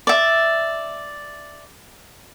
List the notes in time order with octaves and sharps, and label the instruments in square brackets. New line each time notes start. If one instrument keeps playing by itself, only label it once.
[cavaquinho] D5 E5